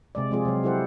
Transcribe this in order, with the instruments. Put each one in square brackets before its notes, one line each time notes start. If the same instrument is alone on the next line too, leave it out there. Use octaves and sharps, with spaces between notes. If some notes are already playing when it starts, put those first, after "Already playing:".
[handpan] C3 G#3 D5
F3 G#3 C4 F4 G#4
C3 F#3
F#3 E4 G4 A4 C5 F#5